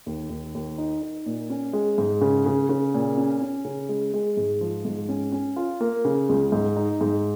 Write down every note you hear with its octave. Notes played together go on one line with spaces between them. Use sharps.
D#2
D#2
D#2
D#4
D#4
A#2
C#4
G#3
G#2
C#3
C#3
C#3
A#2
C#4
C#4
C#3
G#3
G#3
G#2
F3
G#2
C#4
C#4
F4
A#3
C#3
C#2
G#2
D#4
G#2